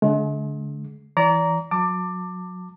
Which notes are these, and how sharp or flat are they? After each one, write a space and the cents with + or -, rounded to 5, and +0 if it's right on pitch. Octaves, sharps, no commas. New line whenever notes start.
D3 -25 G#3 +45
E3 +0 D5 -30 A#5 +0
F#3 -30 A5 +30 D6 +10